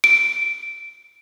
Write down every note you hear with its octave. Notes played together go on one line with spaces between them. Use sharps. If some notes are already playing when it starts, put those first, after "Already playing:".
D7